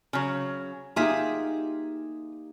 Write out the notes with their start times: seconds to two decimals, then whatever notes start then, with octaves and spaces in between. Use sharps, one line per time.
0.13 C#3 F#3
0.96 A#3 D#4 F4 G4 G#4 E5